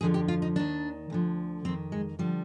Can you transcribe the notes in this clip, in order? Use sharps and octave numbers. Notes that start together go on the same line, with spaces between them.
F2 D3 F3 G#4
G4
F4
D#4
D#2 D#3 D4
D2 D3 F3
F2 D#3 C4
G#3
D3 F3 G3